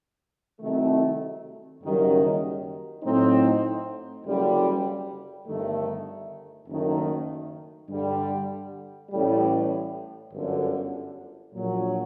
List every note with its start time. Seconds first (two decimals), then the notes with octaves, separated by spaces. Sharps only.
0.60 C2 C3 D#3 F#3 A3
1.81 F#1 F#2 D#3 G3
3.02 A2 F#3 C4 D#4
4.24 F#1 F#2 D3 G3
5.46 G1 G2 D#3 A3
6.67 F#1 F#2 D#3 A3
7.88 G2 D3 G3
9.10 A1 A2 G3
10.32 G1 F#2 D3
11.53 A#1 A#2 F#3